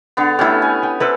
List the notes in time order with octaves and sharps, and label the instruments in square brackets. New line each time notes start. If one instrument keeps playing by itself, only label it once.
[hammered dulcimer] D3 B3
[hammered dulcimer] A3 C#4 [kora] E4 G4
[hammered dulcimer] G#5
[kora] G5
[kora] E4 B4 C5 [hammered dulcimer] A4